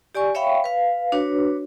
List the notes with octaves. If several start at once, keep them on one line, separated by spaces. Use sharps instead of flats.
G4 D5 G#5 C#6
C#5 E5 F5 G5 B5 C#6
B4 F5
D4 F#4 B4 C#5